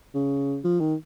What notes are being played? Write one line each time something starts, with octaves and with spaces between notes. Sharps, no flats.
C#3
F3
D#3